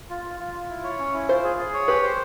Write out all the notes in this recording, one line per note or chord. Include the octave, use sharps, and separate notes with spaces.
F4
F4
F4
F4
E4
C#5
C#4
E4
F4 C5
G#4
G#4
C#5
G4 B4
C5